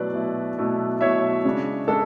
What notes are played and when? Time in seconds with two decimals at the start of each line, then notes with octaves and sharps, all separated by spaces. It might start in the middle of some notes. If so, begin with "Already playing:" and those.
Already playing: B2 F#3 A3 E4 B4 D5
0.14 B2 F#3 A3 E4
0.58 B2 F#3 A3 E4
1.01 B2 F#3 A3 E4 C#5 E5
1.45 C#3 G#3 D4
1.88 G#3 D4 A4